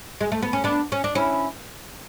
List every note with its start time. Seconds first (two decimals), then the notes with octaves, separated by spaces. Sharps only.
0.21 G#3
0.32 A3
0.42 B3
0.53 C#4
0.64 B3 D4
0.92 C#4
1.04 D4
1.15 C#4 E4